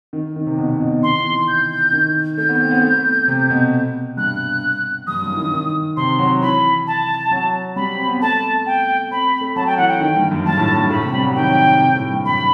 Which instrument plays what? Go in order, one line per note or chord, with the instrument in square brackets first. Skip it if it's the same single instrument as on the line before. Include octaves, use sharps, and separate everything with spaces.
[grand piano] D#3
D#3
C3
B2
B2
B2
B2
[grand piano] D#3 [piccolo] C6
[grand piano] E3
E3
[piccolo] G6
[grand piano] D#3
[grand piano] A3 [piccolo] G6
[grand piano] B3
C4
B3
A3
C3
B2
[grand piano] G2 [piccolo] F#6
[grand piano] F#2 [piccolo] D#6
[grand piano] G2
E3
D#3
D#3
[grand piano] C3 [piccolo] C6
[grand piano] F#3
[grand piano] E3 [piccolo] B5
[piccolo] A5
[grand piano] F#3
[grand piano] G3 [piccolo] B5
[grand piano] C4
B3
[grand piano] A3 [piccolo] A5
[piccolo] G5
[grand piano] C4 [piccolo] B5
[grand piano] A3
[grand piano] F#3 [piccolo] A5
[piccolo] G5
[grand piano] E3 [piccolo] F#5
[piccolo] G5
[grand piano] D#3
G2
F#2
[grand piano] G2 [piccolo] A5
[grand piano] A2
G2
G2
[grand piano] A2 [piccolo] B5
[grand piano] C3
G3
F#3
[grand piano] D#3 [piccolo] G5
[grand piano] C3
A2
G2
[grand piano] F#2 [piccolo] B5